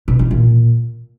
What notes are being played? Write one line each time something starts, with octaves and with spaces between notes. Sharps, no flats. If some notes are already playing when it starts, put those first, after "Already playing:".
B2
E3
A#2